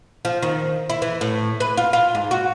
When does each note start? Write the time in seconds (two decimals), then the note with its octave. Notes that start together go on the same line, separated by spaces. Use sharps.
0.25 F3
0.42 D#3
0.90 E4
1.02 E3
1.21 A2
1.60 B4
1.77 F4
1.93 F4
2.15 G#2
2.31 F#4